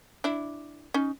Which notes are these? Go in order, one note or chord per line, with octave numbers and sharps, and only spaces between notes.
D4 E4
C#4 D#4